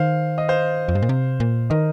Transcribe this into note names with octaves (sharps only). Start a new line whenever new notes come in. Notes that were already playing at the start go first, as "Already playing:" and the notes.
Already playing: D#3 C5 F5
D#5
C5 F5
F2
G2
A#2
C3
A#2
D#3 A#4 D#5